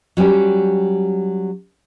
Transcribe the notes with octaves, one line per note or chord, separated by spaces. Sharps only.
F#3 G3 C#4 G4